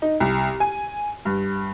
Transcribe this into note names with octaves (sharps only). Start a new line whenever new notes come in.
D#4
C2
G#5
G2